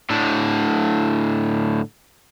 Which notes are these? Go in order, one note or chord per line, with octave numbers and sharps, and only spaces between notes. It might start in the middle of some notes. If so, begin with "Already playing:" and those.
A2 D3